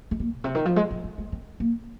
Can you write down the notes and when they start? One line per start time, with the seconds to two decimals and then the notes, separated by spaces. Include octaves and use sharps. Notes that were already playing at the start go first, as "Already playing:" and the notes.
0.11 G#3
0.20 A#3
0.34 A#2
0.44 C3
0.55 D#3
0.65 F3
0.76 G#3
0.91 F3
1.04 F3
1.18 G#3
1.32 C4
1.60 A#3